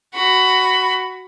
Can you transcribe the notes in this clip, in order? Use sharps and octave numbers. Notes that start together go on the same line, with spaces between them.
F#4 B5